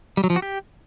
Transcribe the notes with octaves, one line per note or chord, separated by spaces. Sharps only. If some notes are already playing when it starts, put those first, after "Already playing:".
G3
F#3
F3
F#4
G4